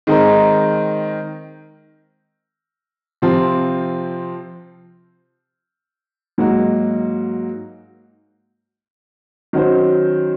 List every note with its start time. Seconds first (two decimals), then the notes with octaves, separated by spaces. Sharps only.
0.07 D#3 G#3 C4 D#4 A#4
3.22 C3 F3 C4 F4
6.38 G#2 F#3 A#3 D#4 F#4
9.53 D#3 F#3 C#4 F#4 C5